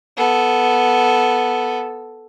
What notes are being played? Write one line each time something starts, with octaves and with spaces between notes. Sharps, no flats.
B3 A4